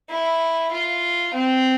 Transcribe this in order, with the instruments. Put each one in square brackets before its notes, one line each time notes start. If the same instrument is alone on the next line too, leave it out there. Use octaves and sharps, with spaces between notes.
[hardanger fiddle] E4
F4
C4